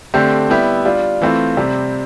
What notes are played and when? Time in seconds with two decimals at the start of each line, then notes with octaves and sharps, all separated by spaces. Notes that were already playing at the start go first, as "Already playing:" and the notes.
0.14 D3 A3 C4 G4
0.50 G3 B3 E4 G4
0.85 G3 D4 F4
1.22 E3 A3 C4 F4
1.57 C3 G3 C4